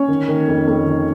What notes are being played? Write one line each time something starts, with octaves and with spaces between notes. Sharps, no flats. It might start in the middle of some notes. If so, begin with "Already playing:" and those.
Already playing: C#4 C#5
D#3
D#3
F2
F2
D#3